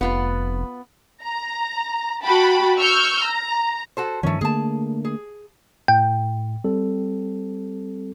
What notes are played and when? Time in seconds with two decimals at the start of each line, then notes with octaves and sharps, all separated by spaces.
0.01 F1 B3 F4 B4
1.23 A#5
2.23 F#4 G5 A5 B5
2.77 C#6 E6 F6 G6
3.24 A#5
3.97 F#4 A4 C5
4.23 G2 D#3 F3 A3 C#4
4.41 D3 A3 A#3 G#4 A5
5.05 G#4
5.88 A2 G5
6.64 G3 C4 A4